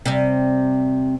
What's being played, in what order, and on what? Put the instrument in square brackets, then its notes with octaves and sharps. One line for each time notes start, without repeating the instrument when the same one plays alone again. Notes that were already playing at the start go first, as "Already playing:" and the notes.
[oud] C3 G3